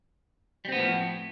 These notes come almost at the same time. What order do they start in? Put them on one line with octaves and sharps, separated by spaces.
G3 C4 B3 A2 F3